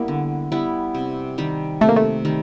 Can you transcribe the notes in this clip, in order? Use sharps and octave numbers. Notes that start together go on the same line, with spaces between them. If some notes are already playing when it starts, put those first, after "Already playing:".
Already playing: G3 A#3 B3 E4
D3
G3 B3 E4
C3
D#3 G3
C3 A3
A#3
A3
D#3 G3